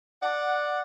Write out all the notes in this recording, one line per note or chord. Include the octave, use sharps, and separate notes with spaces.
D5 F#5